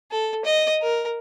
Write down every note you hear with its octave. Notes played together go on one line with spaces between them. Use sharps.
A4
D#5
A#4